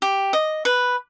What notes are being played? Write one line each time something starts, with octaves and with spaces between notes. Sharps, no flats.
G4
D#5
B4